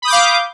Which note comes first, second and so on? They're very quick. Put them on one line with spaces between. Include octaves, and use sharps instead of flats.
B5 D#6 G6 D6 F5